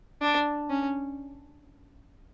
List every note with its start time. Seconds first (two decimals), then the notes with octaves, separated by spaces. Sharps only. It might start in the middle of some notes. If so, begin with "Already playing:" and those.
0.22 D4
0.70 C#4